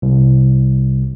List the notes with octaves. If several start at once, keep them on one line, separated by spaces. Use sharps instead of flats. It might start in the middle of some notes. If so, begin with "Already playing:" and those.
C2